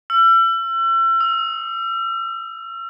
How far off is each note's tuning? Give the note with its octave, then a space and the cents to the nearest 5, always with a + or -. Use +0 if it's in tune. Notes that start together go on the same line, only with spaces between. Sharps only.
E6 +40
E6 -30